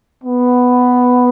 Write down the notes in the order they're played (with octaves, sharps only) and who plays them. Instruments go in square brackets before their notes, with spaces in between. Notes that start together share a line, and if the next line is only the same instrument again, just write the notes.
[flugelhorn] B3